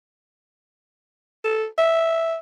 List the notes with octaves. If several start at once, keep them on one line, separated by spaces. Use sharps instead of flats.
A4
E5